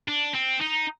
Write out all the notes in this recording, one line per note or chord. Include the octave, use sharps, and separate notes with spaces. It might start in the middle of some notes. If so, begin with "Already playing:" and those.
D4
C4
D#4